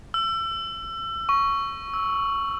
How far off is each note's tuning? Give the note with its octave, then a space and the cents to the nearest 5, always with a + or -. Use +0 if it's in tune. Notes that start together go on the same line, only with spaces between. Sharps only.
E6 +30
C#6 +5
E6 -10